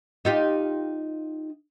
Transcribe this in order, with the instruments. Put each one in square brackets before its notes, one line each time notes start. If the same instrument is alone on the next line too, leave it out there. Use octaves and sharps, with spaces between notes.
[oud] D#4 F4 G4